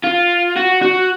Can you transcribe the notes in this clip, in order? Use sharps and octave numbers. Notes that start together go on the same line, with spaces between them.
F4
F#4
F#4